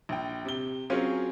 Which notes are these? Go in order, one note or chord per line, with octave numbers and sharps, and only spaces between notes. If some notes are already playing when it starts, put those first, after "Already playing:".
A#1 G5
C3 G7
F#3 C4 C#4 F4 G#4 A#4